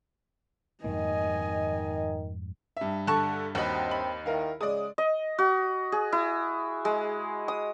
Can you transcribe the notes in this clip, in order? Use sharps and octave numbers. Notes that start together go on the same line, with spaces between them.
F2 G#2 D#3 A#3 D#5 G#5
G2 E5
D3 A5 C#6 F#6
D#2 C4 F#4 D#5 B5
B5
D#3 E4 A#4 F5
C#3 G#3 D5 D#6
D#5
F#4
G#4
E4
G#3
D#6